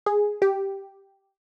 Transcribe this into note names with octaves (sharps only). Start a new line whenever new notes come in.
G#4
G4